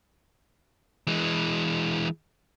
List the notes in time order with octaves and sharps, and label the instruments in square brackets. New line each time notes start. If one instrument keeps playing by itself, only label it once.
[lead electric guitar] E3 G#3